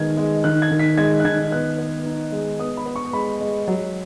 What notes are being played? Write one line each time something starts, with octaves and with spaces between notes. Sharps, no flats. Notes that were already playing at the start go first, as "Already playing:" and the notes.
Already playing: D#3 G#3 B3 G#6
G#3
D#3 F#6
G#6
D#3
B6
G#3 G#6
F#6
D#3 G#6
B3 F#6
B3
D#4
G#3
B3 D#6
B5
B3
C#6
G#3 B5
G#3
F#3